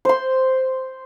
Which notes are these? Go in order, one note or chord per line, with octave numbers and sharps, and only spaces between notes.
C5 C6